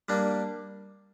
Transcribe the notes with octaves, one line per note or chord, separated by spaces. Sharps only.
G3 A#3 D4